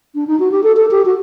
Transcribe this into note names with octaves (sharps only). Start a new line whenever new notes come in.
D4
D#4
F#4
G4
A4
A4
G4
F#4